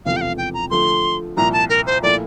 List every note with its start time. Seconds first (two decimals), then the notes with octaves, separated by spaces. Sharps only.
0.05 E1 E2 C3 F3 A3 F5
0.17 G5
0.21 F5
0.38 G5
0.54 A#5
0.70 D3 F3 A3 C6
1.37 C2 A#2 F3 A#5
1.53 A5
1.69 A#4
1.87 C5
2.03 A#2 F3 A3 E4 D5